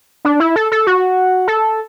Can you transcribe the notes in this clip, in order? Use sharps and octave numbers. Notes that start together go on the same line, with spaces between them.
D4
E4
A4
A4
F#4
A4